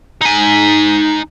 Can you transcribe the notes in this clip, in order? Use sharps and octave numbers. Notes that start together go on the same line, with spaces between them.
D#4 G#5